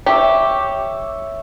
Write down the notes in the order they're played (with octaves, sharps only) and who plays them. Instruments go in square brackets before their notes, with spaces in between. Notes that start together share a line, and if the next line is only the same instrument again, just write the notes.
[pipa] G4 [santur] C#5 E5